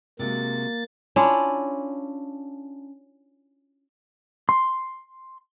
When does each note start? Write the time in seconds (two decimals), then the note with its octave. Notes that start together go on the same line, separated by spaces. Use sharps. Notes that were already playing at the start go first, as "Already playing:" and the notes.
0.19 C3 G#3 A#3 F#4 A6
1.16 C#4 D4 E4 F4
4.49 C6